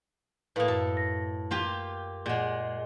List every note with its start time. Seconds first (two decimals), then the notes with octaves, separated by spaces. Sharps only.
0.56 A2 A#3 B4 F5 D#6
0.68 F#2 A4
0.97 A#6
1.51 A#3 F4 G4
2.26 A#2 G#3 G#4 F#5